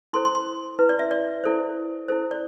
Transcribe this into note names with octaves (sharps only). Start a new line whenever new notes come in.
E4 A4 C5 C6
C6
C6
E4 B4
D5
E5
D5
E4 A4 C5
E4 A4 C5
D5